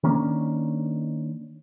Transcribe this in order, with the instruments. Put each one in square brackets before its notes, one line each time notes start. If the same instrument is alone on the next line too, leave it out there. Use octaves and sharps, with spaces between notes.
[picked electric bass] D#3 A#3 C#4 D4